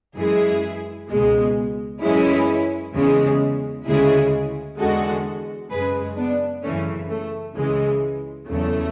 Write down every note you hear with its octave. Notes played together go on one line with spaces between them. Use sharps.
F#2 E3 G#3 E4 G#4
C#2 B2 G#3
F#2 E3 G#3 C#4 E4
E2 C#3 G#3
D2 C#3 G#3 E4 G#4
E2 D3 G#3 F#4 A4
F#2 C#3 G#3 G#4 B4
B3 D4
F#2 C#3 E3 A3 C#4
A3
C#2 C#3 E3 G#3
E2 C#3 F#3 A3